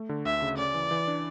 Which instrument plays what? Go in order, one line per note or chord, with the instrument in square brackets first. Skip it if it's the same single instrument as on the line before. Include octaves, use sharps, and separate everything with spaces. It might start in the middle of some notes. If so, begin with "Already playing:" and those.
Already playing: [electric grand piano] A3
D3
[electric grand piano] D2 [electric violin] E5
[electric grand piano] C#3
[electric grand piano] C#4 [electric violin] D5
[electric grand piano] E3
E3
D4